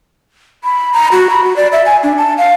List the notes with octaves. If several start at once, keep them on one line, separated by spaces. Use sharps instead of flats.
B5
A#5
F#4
B5
F#4
D5
E5
G#5
D4
A5
F5